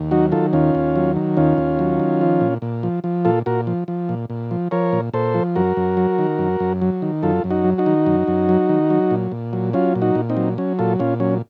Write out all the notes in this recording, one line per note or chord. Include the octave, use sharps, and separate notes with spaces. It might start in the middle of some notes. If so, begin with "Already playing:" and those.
Already playing: D#2
F#3 D#4 F#4
D#3 F4 A4
D#2 C#4 F4
D#2
F#3
D#3
D#2 C#4 F4
D#2
F#3
D#3
F3
A#2
A#2
F3
F3
A#2 F4 A4
A#2 F#4 A#4
F3
F3
A#2
A#2
F3
F3 A#4 C#5
A#2
A#2 A4 C5
F3
F#2 F#4 A#4
F#2
F#3
D#3
F#2
F#2
F#3
D#3
F#2 F4 A4
F#2
D#4 F#4
F#3
D#4 F#4
D#3
F#2
F#2
F#3
D#3
F#3
A#2
A#2
F#3
F#3 C#4 F4
A#2
D#4 F#4
A#2
C4 D#4
F#3
F#3 C#4
A#2 F4 A4
A#2 C#4 F4
F#3 C#4